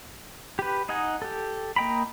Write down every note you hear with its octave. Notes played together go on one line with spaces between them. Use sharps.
G4 B4
D#4 D#5 F#5 G#5
G4 A4
A#3 D#5 G5 A#5 B5